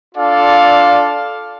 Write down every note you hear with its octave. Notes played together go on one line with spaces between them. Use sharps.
D4 F4 A4 D5 F5